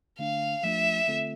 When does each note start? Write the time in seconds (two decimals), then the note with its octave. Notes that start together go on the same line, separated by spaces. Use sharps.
0.19 D3 A3 D4 F5
0.63 F3 A3 D4 F4 E5
1.08 D3 A3 C4 F4 A4